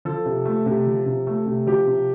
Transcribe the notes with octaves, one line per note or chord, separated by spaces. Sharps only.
F3 A4
C3
A3
C3
F3
C3
A3
C3
F3 G4
C3